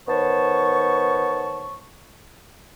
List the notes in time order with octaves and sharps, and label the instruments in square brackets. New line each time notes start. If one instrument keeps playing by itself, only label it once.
[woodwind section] D#3 B3 C5 C#5 A5 C#6